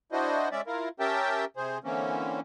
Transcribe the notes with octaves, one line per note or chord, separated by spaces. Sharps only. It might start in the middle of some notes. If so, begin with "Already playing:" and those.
D4 E4 F#4 C5 D#5
G#3 C#4 D5 E5
E4 F4 A#4
C#4 G4 A#4 E5 G5 A5
C3 G#4 C5
D3 E3 A#3 C4 C#4